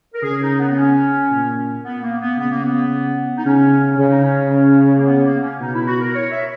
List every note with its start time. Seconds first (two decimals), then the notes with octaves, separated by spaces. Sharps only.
0.13 A#4
0.23 C#3 G#4
0.41 D#4
0.58 B3
0.70 B3
0.76 C#4
1.31 A#2
1.84 B3
2.02 A#3
2.20 B3
2.38 C#3 B3
2.50 A#3
2.63 B3
3.37 D#4
3.44 C#3 C#4
3.98 C#3 C#4
4.10 D#4
4.21 C#4
4.97 A#3
5.06 B3
5.24 A#3
5.41 C#4
5.60 B2 D#4
5.73 E4
5.86 F#4
5.99 A#4
6.13 C#5
6.31 E5